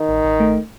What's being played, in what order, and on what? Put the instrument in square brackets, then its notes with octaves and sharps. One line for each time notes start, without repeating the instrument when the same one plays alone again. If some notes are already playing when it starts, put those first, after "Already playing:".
Already playing: [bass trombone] D#3
[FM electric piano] A1
A1
A3